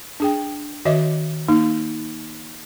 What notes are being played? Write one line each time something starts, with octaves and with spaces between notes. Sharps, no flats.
D4 G#4 G5
D#3 F#4 C#5 D#5 E5 D6
A#3 D#4